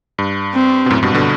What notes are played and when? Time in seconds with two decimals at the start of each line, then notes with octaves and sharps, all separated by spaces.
0.18 G2
0.54 C4
0.86 B2
0.90 F#2 A2
1.03 G2 B2
1.14 B2 D3